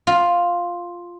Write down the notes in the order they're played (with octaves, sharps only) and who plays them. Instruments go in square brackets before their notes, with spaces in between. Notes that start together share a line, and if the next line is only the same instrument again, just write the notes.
[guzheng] F4